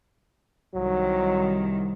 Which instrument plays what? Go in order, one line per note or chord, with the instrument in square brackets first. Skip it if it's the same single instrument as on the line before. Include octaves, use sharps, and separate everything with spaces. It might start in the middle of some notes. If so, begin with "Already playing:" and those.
[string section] C2 D#3 [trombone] F#3